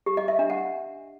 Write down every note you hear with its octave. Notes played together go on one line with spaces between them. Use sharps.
G4
D#5
E5
D4
F#5